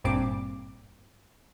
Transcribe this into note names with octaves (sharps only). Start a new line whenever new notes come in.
G#1 G2 A#2 C4 D6